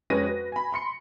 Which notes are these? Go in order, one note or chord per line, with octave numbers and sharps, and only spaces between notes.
F2 G#3 C#4 B4 A#6 D#7
F#4 B4
G#5 B5
B5 C6 C#7